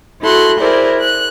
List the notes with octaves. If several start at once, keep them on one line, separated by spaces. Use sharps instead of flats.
E4 F#4 A4 C6 F#6
E4 G#4 A#4 C5 D5
F#6